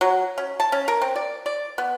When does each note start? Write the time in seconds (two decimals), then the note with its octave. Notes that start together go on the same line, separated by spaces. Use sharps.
0.01 F#3
0.38 C#4
0.60 A5
0.72 C#4
0.88 A#4
1.02 C4
1.16 D5
1.46 D5
1.78 B3